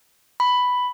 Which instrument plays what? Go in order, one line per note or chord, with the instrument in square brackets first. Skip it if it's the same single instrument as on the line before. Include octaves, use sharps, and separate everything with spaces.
[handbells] B5